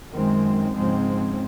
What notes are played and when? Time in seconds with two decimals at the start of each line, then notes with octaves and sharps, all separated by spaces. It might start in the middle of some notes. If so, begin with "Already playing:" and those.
0.12 F#2 D#3 G#3 C4
0.76 G#2 C#3 F3 G#3 C4